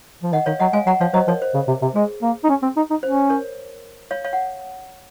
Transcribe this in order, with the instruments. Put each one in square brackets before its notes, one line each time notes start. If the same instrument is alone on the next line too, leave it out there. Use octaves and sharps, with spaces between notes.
[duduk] F3
[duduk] D#3 [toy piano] D#5 F#5
[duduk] D#3 [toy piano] C#5 F5
[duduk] F#3 [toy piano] D#5 F#5
[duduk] G#3 [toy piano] F5 G#5
[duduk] F#3 [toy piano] F#5 A#5
[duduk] F3 [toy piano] C#5 F5
[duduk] F#3 [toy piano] C5 D#5
[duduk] F3 [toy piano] A#4 C#5
[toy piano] C5
[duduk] C#3
C3
C3
[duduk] G#3 [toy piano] G#4
[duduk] A#3
D#4
C#4
C4
D#4
D#4
[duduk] C#4 [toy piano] C5
[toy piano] A#4 C#5
C#5 F5
C#5 F5
F#5